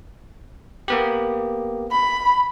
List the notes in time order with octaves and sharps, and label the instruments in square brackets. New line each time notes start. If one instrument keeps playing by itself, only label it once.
[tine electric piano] A#3 B3 G4
[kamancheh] B5